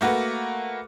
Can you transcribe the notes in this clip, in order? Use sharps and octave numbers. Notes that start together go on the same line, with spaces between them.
A3 A#3 F#4 B4